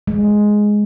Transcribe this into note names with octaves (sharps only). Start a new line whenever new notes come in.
G#3